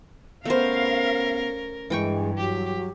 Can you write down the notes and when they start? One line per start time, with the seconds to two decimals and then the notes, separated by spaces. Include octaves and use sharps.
0.45 A3 B3 C#4 A#4 C5 F5
1.90 G2 E3 G#3 G5 C#6
2.37 F#3 G4